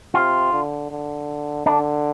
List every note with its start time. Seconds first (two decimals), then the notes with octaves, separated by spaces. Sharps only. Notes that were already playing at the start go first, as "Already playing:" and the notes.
0.14 C3 F4
0.52 D3
0.90 D3
1.66 D3 D4